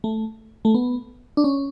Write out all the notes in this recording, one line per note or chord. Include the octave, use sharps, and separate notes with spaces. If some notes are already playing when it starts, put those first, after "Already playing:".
A3
A3
B3
D4
C#4